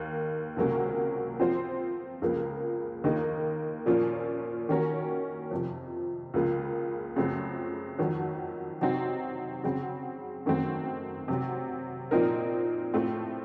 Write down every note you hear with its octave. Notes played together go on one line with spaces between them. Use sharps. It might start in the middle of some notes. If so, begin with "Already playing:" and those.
Already playing: D#2 D#3 A#3
C#2 C3 F#3 A#3 C#4
F3 C4 F4 C5
C#2 C#3 F3 A#3
D#2 D#3 A#3 D#4
A#2 F3 A#3 C#4 F4
D#3 A#3 C#4 F#4 A#4
F2 C3 F3
C#2 C#3 F3 A#3 F4
F#2 C#3 F3 A3 C4
F2 D#3 F#3
C3 F#3 C4 D#4 F#4
C#3 F#3 C4
F#2 D#3 F#3 A3 C4
C3 F#3 C4
A#2 F3 C4 D#4 A#4
A2 A3 C4 F4